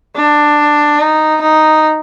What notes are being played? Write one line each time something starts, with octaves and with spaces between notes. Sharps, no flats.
D4
D#4
D#4